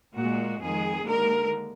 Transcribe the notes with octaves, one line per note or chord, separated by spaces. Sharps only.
A#2 G#3 F#4
F2 D#3 G#3 G#4
D#2 D3 G#3 A#4